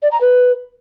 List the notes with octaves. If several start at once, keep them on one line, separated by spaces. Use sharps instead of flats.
D5
A#5
B4